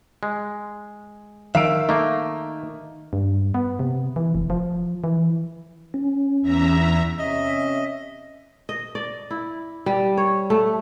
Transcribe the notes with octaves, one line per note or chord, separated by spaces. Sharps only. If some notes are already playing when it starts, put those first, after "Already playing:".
G#3
D#3 E5 F5 E6 D7
A3 A#3 D#4 E5
G2
B3
C3
E3
F1
F3
E3
C#4
E2 E5 A#5
C3 C#4 D#5 E5
D#5
D5
E4
G3
C#5
A3